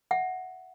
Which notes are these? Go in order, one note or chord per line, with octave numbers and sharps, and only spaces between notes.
E5 F#5